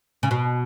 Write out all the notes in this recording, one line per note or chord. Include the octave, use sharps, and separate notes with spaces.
C#3
B2